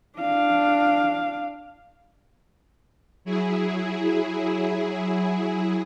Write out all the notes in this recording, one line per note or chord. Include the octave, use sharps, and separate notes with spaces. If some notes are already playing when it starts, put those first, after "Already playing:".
D4 F5
F#3 E4 G#4